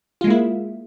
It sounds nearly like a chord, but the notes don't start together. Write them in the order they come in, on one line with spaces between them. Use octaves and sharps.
F4 G#3 A#3 E4